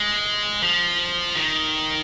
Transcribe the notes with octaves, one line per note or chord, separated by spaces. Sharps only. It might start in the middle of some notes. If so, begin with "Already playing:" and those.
Already playing: G#3
F3
D#3